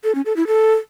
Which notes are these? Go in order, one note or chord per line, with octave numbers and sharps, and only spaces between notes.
A4
C#4
A4
E4
A4